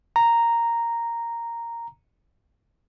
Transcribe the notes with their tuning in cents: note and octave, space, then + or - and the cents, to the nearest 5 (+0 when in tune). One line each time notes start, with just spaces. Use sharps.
A#5 -5